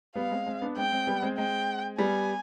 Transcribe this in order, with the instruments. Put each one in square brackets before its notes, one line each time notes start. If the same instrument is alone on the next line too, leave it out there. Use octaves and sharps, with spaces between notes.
[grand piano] G3 B3 [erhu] F5
[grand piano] G#3 C4
G#3 C4
B3 D4
[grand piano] G#3 C4 [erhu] G5
[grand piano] G#3 C4
G3 B3
G#3 C4
[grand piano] G#3 C4 [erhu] G5
[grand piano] G3 B3 [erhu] G#5